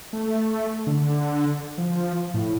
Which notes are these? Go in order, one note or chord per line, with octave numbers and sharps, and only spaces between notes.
A3
D3
F3
A2